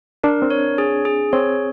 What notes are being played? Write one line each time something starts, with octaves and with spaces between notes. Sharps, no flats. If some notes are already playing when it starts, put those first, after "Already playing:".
D4 A#4
C4
C#5
G#4
G#4
C4 C#5